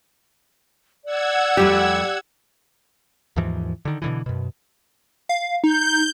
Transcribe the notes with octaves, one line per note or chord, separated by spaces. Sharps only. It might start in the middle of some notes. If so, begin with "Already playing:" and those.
D5 F#5 E6 G#6
F2 G3 A3 G4
D#2 G#2 E3 F3
D3 D#3
B2 D3 E3
F#2 B2
F5
D#4 G6